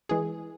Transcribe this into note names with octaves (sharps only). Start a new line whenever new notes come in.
E3 G#3 G#4